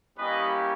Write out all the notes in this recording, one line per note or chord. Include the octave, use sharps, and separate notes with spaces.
G3 A#3 C#4 E4 G4 B4 D#5